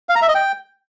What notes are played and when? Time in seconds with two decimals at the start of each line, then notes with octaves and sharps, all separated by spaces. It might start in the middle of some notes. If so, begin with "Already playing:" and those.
0.09 F5
0.15 A#5
0.22 E5
0.28 D#5
0.35 G5